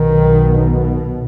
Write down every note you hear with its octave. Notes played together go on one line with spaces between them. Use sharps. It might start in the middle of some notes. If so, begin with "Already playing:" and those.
Already playing: B1 B2 D#3